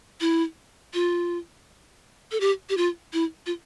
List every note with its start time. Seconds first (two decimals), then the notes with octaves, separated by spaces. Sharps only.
0.21 E4
0.94 F4
2.32 A4
2.40 G4
2.69 G4
2.77 F4
3.13 E4
3.46 F4